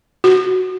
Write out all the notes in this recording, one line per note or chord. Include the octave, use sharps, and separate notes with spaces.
F#4